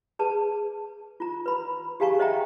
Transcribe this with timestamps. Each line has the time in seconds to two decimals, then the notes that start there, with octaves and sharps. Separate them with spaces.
0.19 G#4 B4 A5
1.20 F4 A#5
1.46 B4 B5
2.00 G4 G#4 F5 G#5 A#5 C#6
2.19 C5 D#5 E5 F#5 G5 A#5